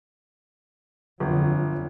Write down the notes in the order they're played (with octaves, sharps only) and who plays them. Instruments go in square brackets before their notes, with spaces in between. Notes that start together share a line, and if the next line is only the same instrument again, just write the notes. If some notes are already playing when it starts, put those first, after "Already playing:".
[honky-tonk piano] G1 [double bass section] F2 D3 F#3